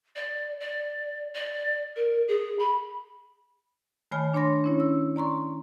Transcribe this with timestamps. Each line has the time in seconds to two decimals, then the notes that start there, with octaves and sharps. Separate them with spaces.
0.15 D5
0.60 D5
1.34 D5
1.96 A#4
2.28 G#4
2.59 B5
4.11 D#3 A3 C#5 G#5 B5 F6
4.34 D4 C#5 B5 C6 A#6
4.64 C#4 E4 C#5
4.80 E6
5.16 D5 A#5 C6 C#6